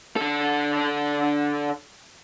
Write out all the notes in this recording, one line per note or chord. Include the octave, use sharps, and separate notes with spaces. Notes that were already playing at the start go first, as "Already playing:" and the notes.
D3 A4